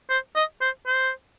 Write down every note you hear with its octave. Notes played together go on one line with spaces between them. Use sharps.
C5
D#5
C5
C5